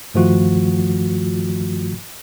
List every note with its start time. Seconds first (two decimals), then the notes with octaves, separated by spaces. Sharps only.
0.14 G2 D#3 F3 A3 F4 F#4